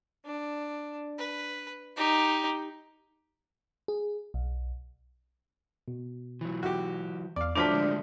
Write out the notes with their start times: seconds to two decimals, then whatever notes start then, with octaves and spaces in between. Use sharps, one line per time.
0.25 D4
1.18 B4
1.96 D#4 G4
3.88 G#4
4.34 B1
5.88 B2
6.41 E3 F#3
6.63 F#4 G4
7.36 E2 D5 F5
7.55 A2 F3 F#3 D4 D5 D6 B6
7.70 D3 G#3 A3